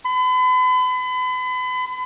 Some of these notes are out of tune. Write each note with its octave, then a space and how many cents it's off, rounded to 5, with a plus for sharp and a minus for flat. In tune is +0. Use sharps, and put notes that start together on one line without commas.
B5 +40